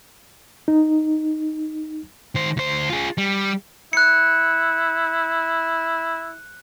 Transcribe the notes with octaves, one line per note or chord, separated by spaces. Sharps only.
D#4
D#3 C5
D2 C5
F4 G#4
G3
E4 F#6 C#7